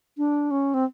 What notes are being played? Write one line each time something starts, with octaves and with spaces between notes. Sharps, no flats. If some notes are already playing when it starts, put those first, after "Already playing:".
D4
C#4
C4